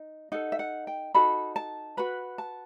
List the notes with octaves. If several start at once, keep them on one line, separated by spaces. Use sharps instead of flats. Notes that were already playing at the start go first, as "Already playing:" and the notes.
Already playing: D#4
D#4 A4 F#5
E5
F#5
G5
D#4 F#4 A4 B5
A5
F#4 B4 B5
A5